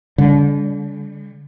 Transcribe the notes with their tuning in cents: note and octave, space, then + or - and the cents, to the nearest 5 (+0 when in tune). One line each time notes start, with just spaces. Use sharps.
D3 -40 G3 +35